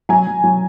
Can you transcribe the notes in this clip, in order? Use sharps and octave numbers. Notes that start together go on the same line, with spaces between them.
F#3 G#5 A#5
F#3
F#3